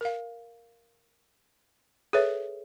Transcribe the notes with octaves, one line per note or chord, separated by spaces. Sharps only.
A#4 F5
G#4 A4 B4 C#5 E5